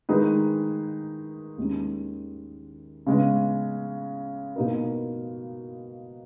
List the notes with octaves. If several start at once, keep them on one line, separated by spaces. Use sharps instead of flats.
D#3 G#3 D#4 G#4 B4
D#2 D#3 G#3 C#4
C#3 G#3 B3
B2 A#3 D#4 A#4